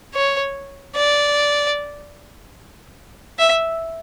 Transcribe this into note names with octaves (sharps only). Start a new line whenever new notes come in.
C#5
D5
E5